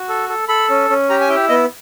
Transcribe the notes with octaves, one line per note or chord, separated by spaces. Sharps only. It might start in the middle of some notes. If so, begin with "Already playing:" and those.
Already playing: F#4
A4
A4
A4 B5
C#4
C#4
G4 A#5
G#5
E4 G5
B3 D#5